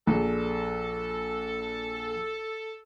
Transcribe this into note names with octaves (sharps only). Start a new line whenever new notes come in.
A#1 G#4 A4 D5